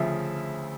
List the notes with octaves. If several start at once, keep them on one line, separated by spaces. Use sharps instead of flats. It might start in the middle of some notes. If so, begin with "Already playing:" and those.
Already playing: D2 C#3 F3 E5